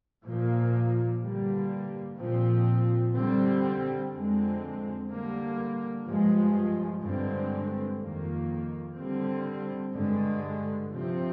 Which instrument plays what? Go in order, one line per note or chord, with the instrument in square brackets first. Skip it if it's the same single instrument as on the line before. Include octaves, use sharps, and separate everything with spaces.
[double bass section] A#2 F3 A#3
G2 D3 G3 A#3
A#2 F3 C4
D3 G3 C4
F2 D3 G#3 C4
D3 G3 A#3
G2 F3 G#3
G2 D3 G#3 C4
F2 D#3 A#3
D3 G3 C4
G2 D3 G#3
C3 F3 C4